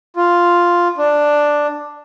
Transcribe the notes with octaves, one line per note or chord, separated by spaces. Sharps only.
F4
D4